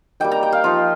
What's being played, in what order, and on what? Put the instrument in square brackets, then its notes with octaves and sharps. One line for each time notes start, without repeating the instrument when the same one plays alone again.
[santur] G3 A#3 D#4 G5
A#5
G5
F5
F3 D#4 F4